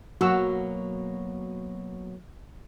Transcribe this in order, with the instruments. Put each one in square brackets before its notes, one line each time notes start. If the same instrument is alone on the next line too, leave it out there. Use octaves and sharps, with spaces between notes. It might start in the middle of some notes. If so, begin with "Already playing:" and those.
[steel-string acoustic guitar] B2 F#3 A#3 [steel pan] F#4 E6